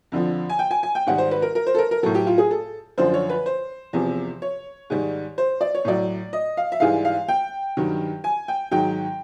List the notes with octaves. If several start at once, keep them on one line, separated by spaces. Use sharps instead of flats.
F2 D3 F3
G#5
G5
G#5
G#5
G5
G#2 D#3 G3 F#5
C5
B4
A#4
A#4
C5
A4
A#4
A#4
A2 F#3 A4
G4
F4
G#4
A4
F#2 D3 F3 C5
C#5
B4
C5
E2 C3 F3
C#5
G#2 D#3 G3
C5
D5
C#5
A2 F#3 D5
D#5
F5
E5
G#2 E3 G3 F5
F5
G5
G2 D#3 F#3
G#5
G5
G#2 D#3 F#3 G5